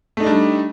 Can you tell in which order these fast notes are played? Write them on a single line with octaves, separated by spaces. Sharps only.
A3 D#4 D4 G3